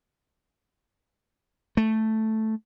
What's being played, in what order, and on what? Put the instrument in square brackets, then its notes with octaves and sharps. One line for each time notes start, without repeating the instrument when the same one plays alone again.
[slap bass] A3